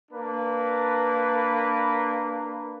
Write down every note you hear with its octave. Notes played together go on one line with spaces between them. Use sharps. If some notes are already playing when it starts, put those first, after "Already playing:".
A#3 D4 B4